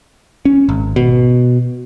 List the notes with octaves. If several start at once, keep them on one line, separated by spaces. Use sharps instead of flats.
C#4
G#1
B2